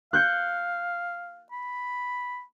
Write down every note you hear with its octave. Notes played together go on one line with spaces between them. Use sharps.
F5 F#6 G6 C#7
B5